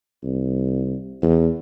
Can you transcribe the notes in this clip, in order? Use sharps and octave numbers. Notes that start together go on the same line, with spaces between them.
C2
E2